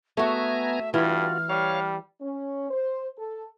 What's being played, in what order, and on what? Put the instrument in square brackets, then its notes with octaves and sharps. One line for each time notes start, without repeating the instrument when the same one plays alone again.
[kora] A3 F#4 [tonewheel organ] B3 G#5 A#5 [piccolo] E5
[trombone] G2 [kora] E3 [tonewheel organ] F4 F#4 [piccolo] F6
[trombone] G3 [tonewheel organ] C#5 F5
[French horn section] C#4
C5
A4